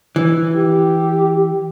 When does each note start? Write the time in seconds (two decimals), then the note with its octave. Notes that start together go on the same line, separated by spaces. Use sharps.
0.16 E3
0.55 G4